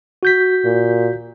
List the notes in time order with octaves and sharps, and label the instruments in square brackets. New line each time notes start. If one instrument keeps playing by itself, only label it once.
[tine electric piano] F#4 G6 B6
[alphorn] A#2